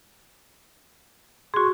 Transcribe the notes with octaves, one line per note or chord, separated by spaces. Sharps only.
F#4 G#4 C6 C#6